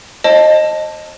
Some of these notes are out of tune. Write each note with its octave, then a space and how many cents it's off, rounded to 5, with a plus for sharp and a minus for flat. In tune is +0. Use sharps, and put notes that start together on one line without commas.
C5 +40 D#5 -10 A5 +0